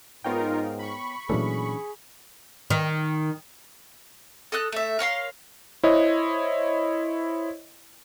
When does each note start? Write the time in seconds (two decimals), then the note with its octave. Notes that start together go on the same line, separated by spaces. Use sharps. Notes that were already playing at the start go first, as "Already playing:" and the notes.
0.24 G#2 B3 D#4 F4 A#4 C#5 G5
0.79 B5 C#6
1.30 A#2 E3 F#3 A3 C#4 D4 G#4
2.70 D#3
4.52 A4 D#5 E6 F#6
4.72 A3 E5
4.99 A#4 C#5 F5 C6
5.83 E4 C5 C#5 D#5